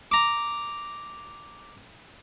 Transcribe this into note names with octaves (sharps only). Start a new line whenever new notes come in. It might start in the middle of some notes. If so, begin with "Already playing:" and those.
A#5 D6